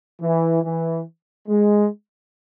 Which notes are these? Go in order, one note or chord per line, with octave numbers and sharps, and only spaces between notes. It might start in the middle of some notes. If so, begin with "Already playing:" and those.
E3
E3
G#3